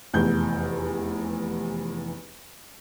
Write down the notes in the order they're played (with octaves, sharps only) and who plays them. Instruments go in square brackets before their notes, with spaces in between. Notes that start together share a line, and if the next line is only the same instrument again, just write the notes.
[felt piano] F1 E2 G6